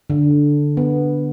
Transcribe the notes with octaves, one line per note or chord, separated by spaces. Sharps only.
D3
B3